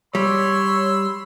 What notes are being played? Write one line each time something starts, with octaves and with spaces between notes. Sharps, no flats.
G3 C#5 B5 C6 E6